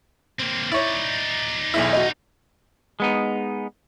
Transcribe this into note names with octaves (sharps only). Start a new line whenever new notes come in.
A#3 C4
D#4 E4 C#5 D5
B1 E2 E4
F#4 D#5
G#3 B3 D#4